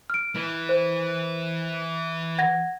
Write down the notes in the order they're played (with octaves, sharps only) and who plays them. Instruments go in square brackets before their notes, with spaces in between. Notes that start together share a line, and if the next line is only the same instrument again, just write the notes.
[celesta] F6 D7
[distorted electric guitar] E3 E4
[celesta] C5
F#5 G#6 A#6